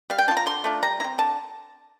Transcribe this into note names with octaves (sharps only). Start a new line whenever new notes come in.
G3 F5
G5
D4 A5
F4
A#5
D3 C6
A3 D4 F4
G3 A#5
C4 E4 A#5
D3 A5